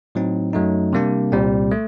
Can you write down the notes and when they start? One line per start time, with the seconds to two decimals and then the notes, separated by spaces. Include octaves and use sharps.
0.15 A2 F#3 C4 D#4
0.53 F#2 F#3 A3 D#4
0.93 C3 G3 A#3 D4
1.32 C2 A#2 G3 C4
1.71 A3